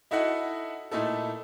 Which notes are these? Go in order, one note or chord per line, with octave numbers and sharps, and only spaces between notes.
D#4 E4 F#4 A4 D#5 F#5
A#2 A3 D#4 E4 A4